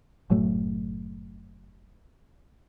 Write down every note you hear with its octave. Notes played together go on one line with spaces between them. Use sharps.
F#1 A2 F#3 A3